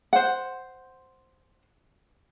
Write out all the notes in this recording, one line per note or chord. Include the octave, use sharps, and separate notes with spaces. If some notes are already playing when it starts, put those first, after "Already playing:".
C5 F#5